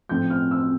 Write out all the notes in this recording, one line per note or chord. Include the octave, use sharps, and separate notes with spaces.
A2 F3 C4 G6
F6
E6